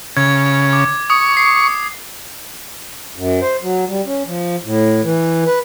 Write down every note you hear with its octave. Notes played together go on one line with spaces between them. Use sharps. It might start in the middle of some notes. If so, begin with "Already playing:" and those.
C#3 G#6
D6
C#6 D#6
C7
F#2
C5
F#3
G3
C#4
F3
A2
E3
B4